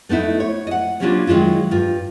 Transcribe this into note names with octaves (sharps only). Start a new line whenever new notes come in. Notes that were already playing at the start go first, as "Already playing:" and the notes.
A3 B3 D#4 E4
C#5
D#5 F#5
F#3 G3 A#3 C#4 D4 F4
D#3 F#3 G#3 E4 F4
G2 F4